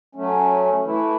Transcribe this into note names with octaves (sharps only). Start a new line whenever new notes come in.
F#3 A3 C#4
E3 A3 E4